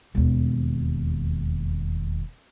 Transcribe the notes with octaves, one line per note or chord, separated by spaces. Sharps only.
E1 D#2